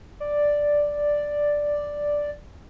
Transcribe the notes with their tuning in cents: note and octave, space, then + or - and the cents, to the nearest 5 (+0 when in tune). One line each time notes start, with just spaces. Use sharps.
D5 +0